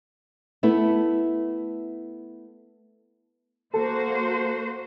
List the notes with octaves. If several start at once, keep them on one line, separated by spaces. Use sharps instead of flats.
A3 B3 E4
A#3 F#4 A4 C5